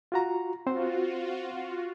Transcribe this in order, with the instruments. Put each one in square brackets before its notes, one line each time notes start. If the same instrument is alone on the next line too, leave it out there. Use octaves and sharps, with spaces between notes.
[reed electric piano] F4 F#4 A#5
[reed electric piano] C4 C5 [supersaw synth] F4 F#4